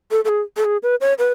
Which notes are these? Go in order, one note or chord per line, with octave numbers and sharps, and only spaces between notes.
A4
A4
G#4
A4
G#4
B4
C#5
B4